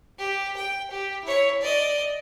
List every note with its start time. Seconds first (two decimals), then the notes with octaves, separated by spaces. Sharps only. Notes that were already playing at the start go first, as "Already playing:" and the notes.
0.19 G4
0.57 G5
0.91 G4
1.25 E4 C#5
1.62 D5 D#5